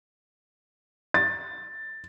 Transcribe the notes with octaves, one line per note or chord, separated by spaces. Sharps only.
A6